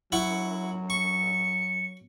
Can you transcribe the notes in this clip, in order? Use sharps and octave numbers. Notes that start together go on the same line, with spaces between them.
F#3 E4 F#5 C#6
C#6 C#7